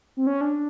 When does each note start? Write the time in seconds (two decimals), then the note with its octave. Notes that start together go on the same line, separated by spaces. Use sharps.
0.17 C4
0.27 C#4
0.41 D4